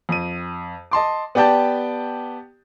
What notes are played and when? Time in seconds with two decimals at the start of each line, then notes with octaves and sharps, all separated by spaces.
0.09 F2 D#7
0.91 D#5 A5 C6 D6
1.35 B3 G4 D5 G5 A5